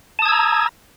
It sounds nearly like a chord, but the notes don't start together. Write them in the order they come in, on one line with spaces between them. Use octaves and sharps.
A5 D#6 G#6 E6 A#5